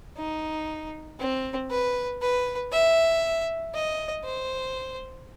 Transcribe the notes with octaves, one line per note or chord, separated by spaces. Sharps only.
D#4
C4
B4
B4
E5
D#5
C5